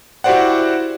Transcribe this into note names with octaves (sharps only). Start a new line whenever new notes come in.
E4 F#4 G4 C5 D5 F#5